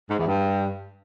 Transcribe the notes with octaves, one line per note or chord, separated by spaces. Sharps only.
G#2
E2
G2